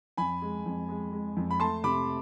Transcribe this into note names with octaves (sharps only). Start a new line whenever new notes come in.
F2 G#5 B5
G#3
F2
G#3
G#3
F2
B5
A3 A5 C6
C3 B5 D6